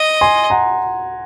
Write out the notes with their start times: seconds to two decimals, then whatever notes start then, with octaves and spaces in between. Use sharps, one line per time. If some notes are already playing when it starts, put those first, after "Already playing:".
Already playing: D#5
0.21 G#5 C6
0.50 F#5 A#5